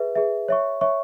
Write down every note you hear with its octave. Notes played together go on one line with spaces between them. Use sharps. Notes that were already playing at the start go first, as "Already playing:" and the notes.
Already playing: G#4 B4 E5
G#4 B4 E5
C#5 E5 C#6
C#5 E5 C#6